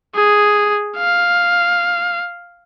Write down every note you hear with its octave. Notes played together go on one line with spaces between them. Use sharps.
G#4
F5